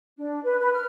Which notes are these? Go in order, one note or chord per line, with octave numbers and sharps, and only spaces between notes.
D4
B4
B4
F6